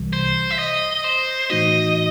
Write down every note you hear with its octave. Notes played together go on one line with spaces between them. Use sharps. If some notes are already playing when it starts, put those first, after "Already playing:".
Already playing: C2 C3 E3 G3
C5
E5
D#5
C5
A2 E3 A3 D#4 F#4 D#5